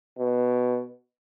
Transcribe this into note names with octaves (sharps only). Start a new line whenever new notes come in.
B2